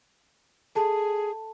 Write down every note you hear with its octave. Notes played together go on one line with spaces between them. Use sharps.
G#4 A4 A5